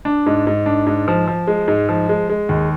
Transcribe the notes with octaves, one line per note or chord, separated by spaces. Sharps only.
D4
G#2
G#2
D4
G#2
F3
F3
G#3
G#2
F3
G#3
G#3
D#2